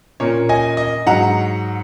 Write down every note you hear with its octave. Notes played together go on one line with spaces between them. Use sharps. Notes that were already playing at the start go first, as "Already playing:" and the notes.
A#2 A#3 C#4 C#5
D#5 G#5
D#5
G#2 F#3 D#4 F#5 A#5